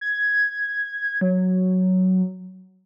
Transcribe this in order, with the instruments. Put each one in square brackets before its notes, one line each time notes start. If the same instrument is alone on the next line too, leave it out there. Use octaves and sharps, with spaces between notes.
[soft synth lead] G#6
F#3